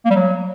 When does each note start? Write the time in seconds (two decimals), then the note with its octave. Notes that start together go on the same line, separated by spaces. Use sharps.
0.05 A#3
0.10 G3
0.16 F#3